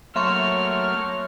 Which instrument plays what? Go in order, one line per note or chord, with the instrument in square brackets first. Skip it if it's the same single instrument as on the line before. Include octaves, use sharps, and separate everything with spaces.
[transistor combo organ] F#3 A3 A#3 [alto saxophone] C#5 [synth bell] E5 C6 C#6 [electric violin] F6